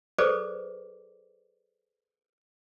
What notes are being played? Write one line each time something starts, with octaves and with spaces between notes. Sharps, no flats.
G#4 A4 B4 C5 D5 D6